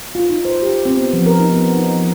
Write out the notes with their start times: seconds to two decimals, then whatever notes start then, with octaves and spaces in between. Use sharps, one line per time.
0.15 F4
0.29 D#4
0.45 C5
0.62 G4
0.85 C4
0.97 B3
1.13 F3
1.26 A#4
1.39 D#4
1.52 B3
1.73 D#4
1.96 F3